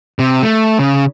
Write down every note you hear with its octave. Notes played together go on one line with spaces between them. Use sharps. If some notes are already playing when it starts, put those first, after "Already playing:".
C3
A3
C#3